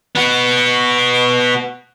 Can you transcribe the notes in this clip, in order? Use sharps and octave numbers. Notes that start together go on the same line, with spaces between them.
B3 F#4